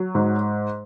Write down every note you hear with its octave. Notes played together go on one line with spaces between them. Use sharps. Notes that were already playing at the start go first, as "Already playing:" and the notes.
Already playing: F#3
G#2